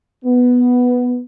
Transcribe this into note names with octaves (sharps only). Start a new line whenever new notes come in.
B3